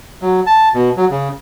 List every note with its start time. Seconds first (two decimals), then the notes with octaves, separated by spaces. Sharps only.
0.22 F#3
0.46 A5
0.75 B2
0.97 F#3
1.10 C#3